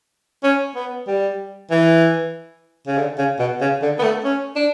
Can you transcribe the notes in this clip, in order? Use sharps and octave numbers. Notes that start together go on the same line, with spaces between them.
C#4
B3
G3
E3
C#3
D3
C#3
B2
C#3
D3
B3
A3
C#4
D4